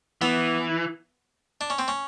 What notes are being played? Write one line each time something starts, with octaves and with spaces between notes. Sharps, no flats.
E3 B3
D4
C#4
C4
C#4